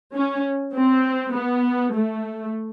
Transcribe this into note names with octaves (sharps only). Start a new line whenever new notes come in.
C#4
C4
B3
A3